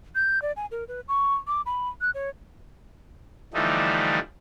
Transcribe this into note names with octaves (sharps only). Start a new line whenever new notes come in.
G6
D5
G#5
A#4
B4
C#6
D6
B5
F#6
C#5
D3 E3 F3 G3 A3 D#4